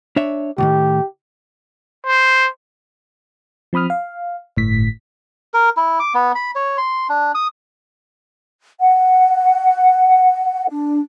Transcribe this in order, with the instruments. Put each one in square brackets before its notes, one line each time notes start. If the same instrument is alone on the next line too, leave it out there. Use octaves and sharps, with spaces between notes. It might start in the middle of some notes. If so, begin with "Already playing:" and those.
[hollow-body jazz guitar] D4 C#5 E5
[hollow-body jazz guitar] C#2 A2 D#3 [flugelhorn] G4
[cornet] C5
[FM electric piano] F3 C4 B5 D#6 F6
F5
G1 A2 B6
[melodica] A#4
E4
D6
B3
B5
C#5
C6
D4
D#6
[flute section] F#5
D4